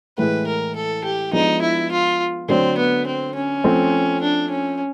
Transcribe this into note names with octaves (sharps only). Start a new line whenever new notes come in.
A2 E3 G#3 B4
A#4
A4
G4
F3 G#3 B3 D4 D#4
E4
F4
D3 F#3 A3 C4 D4
B3
C4
C#4
F3 A3 C4
D4
C#4